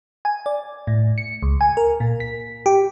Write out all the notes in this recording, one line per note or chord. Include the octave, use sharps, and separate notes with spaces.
G#5
D5
A2
C#7
C#2
G#5
A#4
A#2
B6
G4